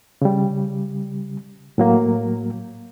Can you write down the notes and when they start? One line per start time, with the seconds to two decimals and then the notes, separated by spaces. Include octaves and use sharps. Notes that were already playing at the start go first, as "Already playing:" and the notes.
0.22 C#3 G3
1.78 A2 F#3 A#3